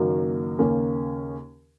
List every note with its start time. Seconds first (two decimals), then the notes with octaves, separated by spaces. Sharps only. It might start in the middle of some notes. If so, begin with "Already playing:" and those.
Already playing: F#1 F#2 D#3 A#3 F#4
0.59 D#2 C#3 A#3 C#4